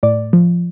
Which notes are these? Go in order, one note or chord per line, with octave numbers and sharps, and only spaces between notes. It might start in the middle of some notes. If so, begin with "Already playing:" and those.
A2 D5
F3